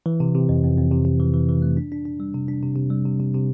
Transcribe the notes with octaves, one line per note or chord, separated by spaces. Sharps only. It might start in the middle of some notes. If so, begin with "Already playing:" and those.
E3
C3
C3
F2
F2
F2
C3
C3
E3
E3
E3
A3
D4
D4
D4
G3
C3
D4
C3
C3
G3
C3
C3
C3